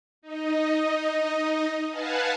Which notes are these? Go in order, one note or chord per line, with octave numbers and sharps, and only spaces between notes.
D#4 D#5
B4 F5 F#5 G#5 A5